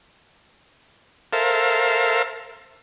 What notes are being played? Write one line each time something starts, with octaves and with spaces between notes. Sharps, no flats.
A4 A#4 C5 E5 F5